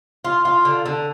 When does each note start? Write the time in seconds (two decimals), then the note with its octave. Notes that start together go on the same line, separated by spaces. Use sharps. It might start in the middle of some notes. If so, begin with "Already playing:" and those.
0.25 F4
0.45 F4
0.65 D3
0.86 D3